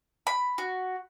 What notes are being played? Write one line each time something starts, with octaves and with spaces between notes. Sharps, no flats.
B5
F#4